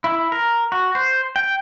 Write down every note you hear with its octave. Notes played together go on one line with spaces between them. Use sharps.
E4
A#4
F#4
C5
G5